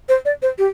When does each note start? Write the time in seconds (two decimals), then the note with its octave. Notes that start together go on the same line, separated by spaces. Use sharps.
0.09 C5
0.25 D5
0.42 C5
0.58 G4